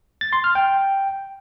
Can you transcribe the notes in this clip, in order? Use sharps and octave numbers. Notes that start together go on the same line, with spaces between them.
A6
C6
F6
G5